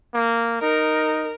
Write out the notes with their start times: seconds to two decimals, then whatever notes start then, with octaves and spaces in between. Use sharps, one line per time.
0.14 A#3
0.62 D#4 A#4